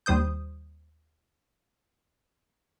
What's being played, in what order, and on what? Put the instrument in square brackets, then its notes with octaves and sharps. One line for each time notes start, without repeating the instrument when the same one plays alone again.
[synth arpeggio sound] D#2 G3 C5 D#6 G6